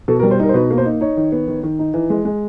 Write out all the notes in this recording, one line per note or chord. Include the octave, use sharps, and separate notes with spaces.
B2 A4
A#4
G3
C5
D#4 A#4
C5
B2 B4
A#3
C5
D#4
D#4 C#5
D#3
B3
D#3
D#3
D#4
E3
G#3
G#3